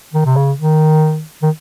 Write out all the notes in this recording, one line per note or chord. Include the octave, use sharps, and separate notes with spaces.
D#3
C3
C#3
D#3
D#3